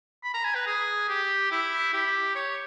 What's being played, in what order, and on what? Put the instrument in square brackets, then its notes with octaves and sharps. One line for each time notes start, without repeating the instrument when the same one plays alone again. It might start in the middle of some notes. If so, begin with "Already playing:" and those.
[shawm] B5
A#5
G#5
B4
G#4
G4
E4
G4
C#5